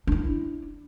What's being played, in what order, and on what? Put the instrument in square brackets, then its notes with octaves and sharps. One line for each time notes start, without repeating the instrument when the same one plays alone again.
[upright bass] D4 E4